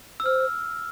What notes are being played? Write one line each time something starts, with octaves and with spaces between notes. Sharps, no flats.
E6
C5 F6